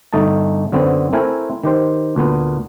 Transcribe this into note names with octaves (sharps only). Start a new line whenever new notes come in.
G1 A3 D#4 D#5 A5
F#2 D3 B3 C4
A3 C4 E4 A#4 C5 G#5
D#3 G4 C5
D2 A#2 B3